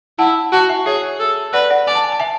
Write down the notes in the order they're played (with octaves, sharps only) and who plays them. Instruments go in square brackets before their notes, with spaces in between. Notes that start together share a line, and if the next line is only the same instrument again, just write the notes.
[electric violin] E4 [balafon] F#5 A5
[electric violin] F#4 [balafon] F#5 A5
[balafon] E5 G#5
[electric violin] G#4 [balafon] C#5 E5
[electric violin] A4
[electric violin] B4 [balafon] D5 F#5
[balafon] D5 F#5
[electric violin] D5 [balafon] G#5
[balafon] A5
G#5
A5
E5 G#5